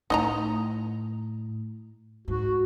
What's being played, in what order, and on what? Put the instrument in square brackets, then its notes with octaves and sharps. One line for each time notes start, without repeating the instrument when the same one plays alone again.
[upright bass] A2 [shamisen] D#4 D#5 A#5
[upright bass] G#2 [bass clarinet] F#4